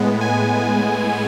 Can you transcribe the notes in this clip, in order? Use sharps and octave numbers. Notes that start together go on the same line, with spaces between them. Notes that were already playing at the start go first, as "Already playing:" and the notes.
Already playing: A2 G#3 B3
G#5